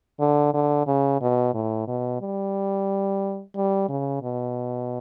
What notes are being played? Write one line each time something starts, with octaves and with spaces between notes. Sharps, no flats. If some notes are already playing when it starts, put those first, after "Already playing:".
D3
D3
C#3
B2
A2
B2
G3
G3
C#3
B2